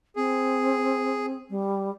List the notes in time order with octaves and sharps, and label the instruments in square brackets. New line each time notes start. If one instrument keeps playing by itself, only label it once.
[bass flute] C4 [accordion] G#4
[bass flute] G3